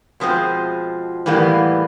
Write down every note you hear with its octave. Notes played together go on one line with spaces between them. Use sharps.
B2 F3 G#3 C4
A2 E3 G3 A#3 B3